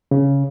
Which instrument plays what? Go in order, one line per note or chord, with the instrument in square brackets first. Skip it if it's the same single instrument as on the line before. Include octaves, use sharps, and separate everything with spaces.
[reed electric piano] C#3